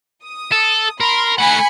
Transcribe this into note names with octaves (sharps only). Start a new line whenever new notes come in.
D#6
A4
A#4 B5 C6
A3 F#5 G#5 B5 C#7